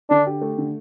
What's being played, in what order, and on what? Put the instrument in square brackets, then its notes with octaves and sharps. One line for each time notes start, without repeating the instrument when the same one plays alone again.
[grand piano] D3 [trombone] D4
[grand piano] G4
A3
D3